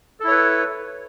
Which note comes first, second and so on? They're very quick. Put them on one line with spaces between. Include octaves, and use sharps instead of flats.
A4 E4 C#5 B4